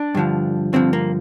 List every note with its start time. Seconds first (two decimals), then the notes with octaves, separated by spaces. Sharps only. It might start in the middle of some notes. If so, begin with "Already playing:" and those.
Already playing: D4
0.15 G2 D3 F3
0.73 G2 D3 F3 C4
0.93 A#3